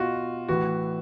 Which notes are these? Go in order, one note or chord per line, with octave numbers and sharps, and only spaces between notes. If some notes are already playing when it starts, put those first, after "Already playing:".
Already playing: B2 F4 F#4
A2 E3 F#4